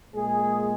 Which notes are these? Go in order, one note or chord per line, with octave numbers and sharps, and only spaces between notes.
A#2 G#3 G#4